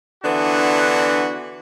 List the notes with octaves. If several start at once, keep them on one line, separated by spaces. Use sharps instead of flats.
D3 E3 B3 D4 F#4